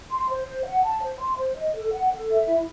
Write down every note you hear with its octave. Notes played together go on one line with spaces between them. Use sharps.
C6
C5
C5
F#5
A5
C5
C6
C5
D#5
A4
F#5
A4
E5
E4